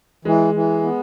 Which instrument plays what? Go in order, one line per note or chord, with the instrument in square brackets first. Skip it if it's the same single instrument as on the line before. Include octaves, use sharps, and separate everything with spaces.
[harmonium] E3 [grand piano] G#3
[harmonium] E3
B3